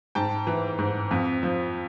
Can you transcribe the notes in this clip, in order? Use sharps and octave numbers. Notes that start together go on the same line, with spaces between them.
G#2 G5 A5
E3
G#2
F2
F3